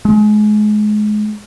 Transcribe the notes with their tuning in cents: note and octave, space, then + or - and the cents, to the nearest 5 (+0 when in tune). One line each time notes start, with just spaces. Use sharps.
G#3 +30